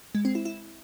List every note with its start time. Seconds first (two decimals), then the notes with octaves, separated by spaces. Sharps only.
0.15 G#3
0.25 C4
0.35 E4
0.45 E4